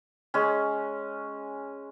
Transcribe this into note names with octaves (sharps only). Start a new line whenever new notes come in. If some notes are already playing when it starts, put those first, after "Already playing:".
G#3 C#4